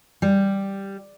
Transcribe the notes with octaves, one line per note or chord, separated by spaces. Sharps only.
G3